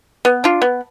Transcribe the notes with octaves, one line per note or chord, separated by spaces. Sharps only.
B3
D4 F4
B3